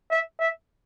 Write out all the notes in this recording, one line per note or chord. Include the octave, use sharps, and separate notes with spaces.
E5
E5